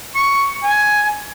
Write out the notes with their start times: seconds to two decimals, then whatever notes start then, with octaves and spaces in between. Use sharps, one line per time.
0.15 C#6
0.63 G#5